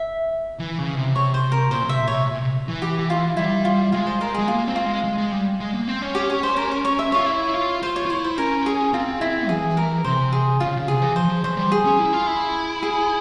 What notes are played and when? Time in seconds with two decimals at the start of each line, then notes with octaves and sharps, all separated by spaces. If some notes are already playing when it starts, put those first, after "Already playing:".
Already playing: E5
0.59 E3
0.78 C#3
0.96 C3
1.15 C#5
1.34 C5
1.52 A#4
1.71 A#2 C5
1.85 C3 E5
1.98 A#2
2.08 C3 C#5
2.26 A#2
2.40 C3
2.68 E3
2.82 G4
3.10 F4
3.37 G3 E4
3.65 F4
3.92 G#3 F4
4.07 C5
4.21 A#4
4.35 G#3 G#4
4.48 A#3 F4
4.68 C4
4.76 F4
4.86 G#3
5.04 G#3
5.18 G#3
5.32 G3
5.60 G#3
5.73 A#3
5.88 C4
6.02 C#4
6.15 G4
6.30 C#5
6.43 C5
6.57 A#4
6.71 A#4
6.85 C#5
6.99 E5
7.12 F4 C#5
7.26 E4
7.54 F4
7.82 F4 C5
7.96 C#5
8.06 F4
8.10 E4 C#5
8.24 C5
8.38 C#4 A#4
8.66 G#4
8.93 C4 F4
9.21 C4 E4
9.49 E3 G#4
9.77 A#4
10.05 C3 C5
10.32 G#4
10.60 C#3 F4
10.77 C#3
10.88 C3 G#4
11.02 E3
11.16 F3 C5
11.29 F3
11.44 E3 C5
11.57 G3
11.72 G#4
11.85 C#4
11.99 E4
12.13 F4
12.27 E4
12.83 G#4